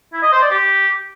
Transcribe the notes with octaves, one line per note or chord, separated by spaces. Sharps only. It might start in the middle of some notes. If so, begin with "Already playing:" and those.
E4
D#5
C5
D5
G4